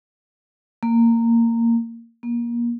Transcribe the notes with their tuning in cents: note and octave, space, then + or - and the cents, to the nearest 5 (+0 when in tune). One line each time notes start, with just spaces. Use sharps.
A#3 -15
A#3 +25